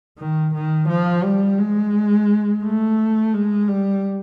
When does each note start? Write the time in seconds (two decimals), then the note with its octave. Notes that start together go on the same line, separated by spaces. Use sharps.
0.18 D#3
0.54 D#3
0.89 F3
1.24 G3
1.59 G#3
2.64 A3
3.34 G#3
3.68 G3